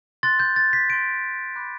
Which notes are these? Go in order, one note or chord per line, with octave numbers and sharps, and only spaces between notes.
C6 F#6 A6
G6
A6
B6
C6 G6 D7
B5 D6 F#6